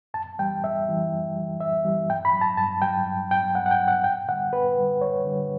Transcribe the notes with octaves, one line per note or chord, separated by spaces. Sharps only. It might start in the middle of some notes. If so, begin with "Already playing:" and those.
F#2 A5
E3 G3 G5
F#2 E5
E3 G3
F#2
E3 G3
F#2 E5
E3 G3
G2 G5
B5
F#3
A5
G2 A5
F#3 G5
G2
F#3 G5
G2 F#5
F#5
G5
F#3
F#5
F#2 G5
D3 G3 F#5
F#2 B4
D3 G3
F#2 C#5
D3 G3